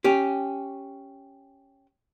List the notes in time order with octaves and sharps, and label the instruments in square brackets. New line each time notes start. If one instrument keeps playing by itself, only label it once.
[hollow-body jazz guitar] C#4 G4